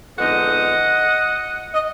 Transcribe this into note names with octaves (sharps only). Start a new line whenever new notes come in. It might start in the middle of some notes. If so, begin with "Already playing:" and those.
F2 D3 G#3 B3 D#4 D#5 F#5
D#5